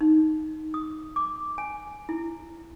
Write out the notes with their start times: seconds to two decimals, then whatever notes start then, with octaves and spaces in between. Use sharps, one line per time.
0.01 D#4
0.74 D#6
1.16 D6
1.58 G#5
2.09 E4